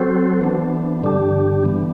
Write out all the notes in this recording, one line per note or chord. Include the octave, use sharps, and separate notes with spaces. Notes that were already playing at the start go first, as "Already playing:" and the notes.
Already playing: F#3 C4 F#4 A4 C5
E3 B3 D4
G2 D3 G3 D4 G4
E3 B3 D4